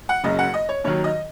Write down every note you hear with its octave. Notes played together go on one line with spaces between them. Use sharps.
F#5
F#1 F#2 C#3 F#3 D#5
F#5
D#5
C#5
D#2 D#3 F#3 C#5
D#5